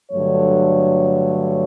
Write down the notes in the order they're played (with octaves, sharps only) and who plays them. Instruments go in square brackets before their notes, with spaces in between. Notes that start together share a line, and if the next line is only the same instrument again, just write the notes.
[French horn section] G2 D3 F#3 A3 C#5